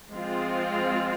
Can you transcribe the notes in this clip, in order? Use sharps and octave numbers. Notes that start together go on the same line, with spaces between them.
F3 G#3 C4 F4